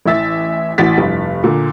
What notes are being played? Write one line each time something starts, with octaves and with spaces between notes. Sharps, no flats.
A1 E3 E5 A6
A1 F#4 A6 B6
F1 G2
A#2 D3